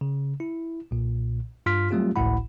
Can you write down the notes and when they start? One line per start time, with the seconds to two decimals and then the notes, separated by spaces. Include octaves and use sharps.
0.01 C#3
0.40 E4
0.91 B1 A#2
1.66 G2 F4 C6 F6 B6
1.91 F#3 G3 A3 C4 F4 G4
2.16 G#1 C#2 A2 E4 F#5 B5